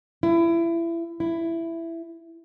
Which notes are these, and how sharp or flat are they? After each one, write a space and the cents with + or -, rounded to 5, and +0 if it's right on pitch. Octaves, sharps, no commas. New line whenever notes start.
E4 +25
E4 +10